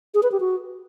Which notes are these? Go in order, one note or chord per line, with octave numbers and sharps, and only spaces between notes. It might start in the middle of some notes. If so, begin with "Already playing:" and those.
G#4
B4
G4
F#4